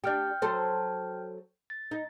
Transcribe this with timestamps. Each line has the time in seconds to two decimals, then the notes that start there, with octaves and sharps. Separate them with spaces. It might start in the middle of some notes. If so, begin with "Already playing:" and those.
0.04 D4 G4 G5 F6 G6
0.42 F#3 A4 C5
1.70 A6
1.91 D#4